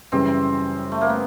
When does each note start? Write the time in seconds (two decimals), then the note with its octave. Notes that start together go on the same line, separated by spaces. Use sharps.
0.12 F#2 C#3 E3 G3 C4
0.92 A3
1.01 A#3
1.09 B3